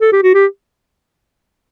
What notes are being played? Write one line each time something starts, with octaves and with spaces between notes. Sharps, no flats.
A4
G4
F#4
G4